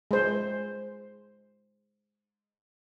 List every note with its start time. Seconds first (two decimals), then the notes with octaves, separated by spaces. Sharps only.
0.11 G#3 C5